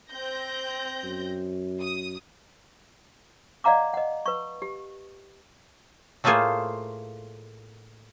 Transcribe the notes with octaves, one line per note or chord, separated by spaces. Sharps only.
C4 G6 A#6
F#2
D#6
D5 D#5 F5 F#5 A#5 D6
D#5 F#5
B4 C#6
G4
A2 A3 A#3 F4 G#4 C5